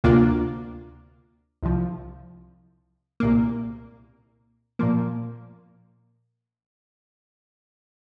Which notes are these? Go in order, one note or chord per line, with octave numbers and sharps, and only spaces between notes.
D2 C3 A#3 D4 F4
C2 C3 F3
C2 A#2 A#3
A#2 F3 A#3